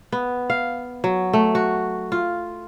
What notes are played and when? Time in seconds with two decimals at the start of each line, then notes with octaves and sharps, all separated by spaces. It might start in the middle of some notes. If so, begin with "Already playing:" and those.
0.12 B3
0.50 F5
1.04 F#3
1.33 A3
1.55 F#4
2.12 F4